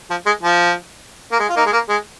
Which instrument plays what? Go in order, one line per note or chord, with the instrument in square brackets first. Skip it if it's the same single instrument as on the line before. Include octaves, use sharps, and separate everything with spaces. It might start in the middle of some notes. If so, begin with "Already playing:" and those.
[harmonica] F3
G#3
F3
A#3
G#3
F4
A#3 D#4
G#3
A#3
G#3